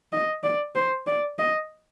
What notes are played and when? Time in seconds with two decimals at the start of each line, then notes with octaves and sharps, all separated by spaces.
0.13 D#5
0.43 D5
0.75 C5
1.06 D5
1.39 D#5